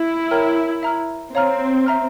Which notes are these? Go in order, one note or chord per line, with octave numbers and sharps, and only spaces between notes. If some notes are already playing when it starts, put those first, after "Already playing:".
Already playing: E4
A#4 C#5 G5 A#5 F6
E5 A#5 F6
C4 C#5 F5 A#5 F6
E5 A#5 F6